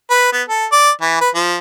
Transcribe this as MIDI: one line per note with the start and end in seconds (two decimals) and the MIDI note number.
0.10 0.30 71
0.32 0.43 59
0.48 0.66 69
0.72 0.90 74
1.01 1.20 52
1.21 1.29 71
1.35 1.58 53